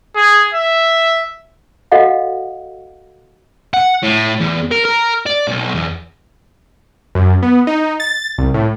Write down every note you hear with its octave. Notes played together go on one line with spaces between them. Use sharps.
G#4
E5
F#4 A4 D#5 F5 F#5
F#5
A2
E2
A#4
A#4
D5
B1
E2
F#2
B3
D#4
A6
C2
A2